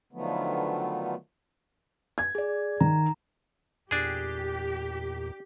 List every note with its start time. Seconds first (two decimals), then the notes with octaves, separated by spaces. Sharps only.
0.13 D3 D#3 F3 F#3 A3 B3
2.18 G#6
2.35 G#4 D5
2.81 D#3 A#5
3.91 E2 A#2 D4 G4 G#4